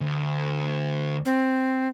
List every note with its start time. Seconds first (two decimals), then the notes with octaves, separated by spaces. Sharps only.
0.01 D2
1.25 C4